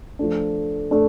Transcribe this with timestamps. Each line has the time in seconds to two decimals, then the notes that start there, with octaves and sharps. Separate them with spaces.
0.19 F3 A3 D4
0.91 A3 D4